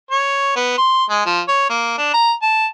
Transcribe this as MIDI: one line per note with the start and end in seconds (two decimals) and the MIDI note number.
0.11 0.53 73
0.56 0.74 59
0.78 1.05 84
1.10 1.25 56
1.26 1.41 53
1.48 1.66 73
1.70 1.93 58
1.98 2.09 62
2.14 2.33 82
2.42 2.66 81